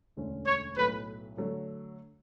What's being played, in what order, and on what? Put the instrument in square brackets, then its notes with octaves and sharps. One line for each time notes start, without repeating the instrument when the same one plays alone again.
[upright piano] E1 D2 D3 A3 C#4
[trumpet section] C#5
[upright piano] B1 A2 F#3 A3 [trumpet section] B4
[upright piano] D3 F#3 A3